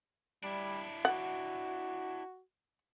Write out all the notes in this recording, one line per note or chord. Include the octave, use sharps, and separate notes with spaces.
G3 D4 E4
F#4 F#5